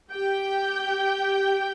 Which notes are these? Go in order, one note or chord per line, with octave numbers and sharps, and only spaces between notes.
G4 G5